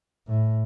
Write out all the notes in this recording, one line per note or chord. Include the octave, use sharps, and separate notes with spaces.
A2